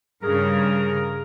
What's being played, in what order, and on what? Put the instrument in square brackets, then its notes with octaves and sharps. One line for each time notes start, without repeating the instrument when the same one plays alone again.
[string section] G2 C#3 [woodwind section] G#4 A#4